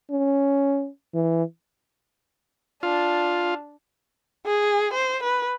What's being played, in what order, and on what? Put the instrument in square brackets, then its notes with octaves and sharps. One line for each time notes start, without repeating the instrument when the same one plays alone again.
[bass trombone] C#4
E3
[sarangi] D4 [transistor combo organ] F4
[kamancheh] G#4
C5
B4